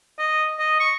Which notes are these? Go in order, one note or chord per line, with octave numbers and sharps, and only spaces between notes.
D#5
D#5
C#6